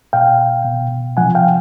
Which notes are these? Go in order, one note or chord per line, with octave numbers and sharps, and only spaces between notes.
B2 F5 G5
B2
C3 F3 F#5 G#5
F5 G5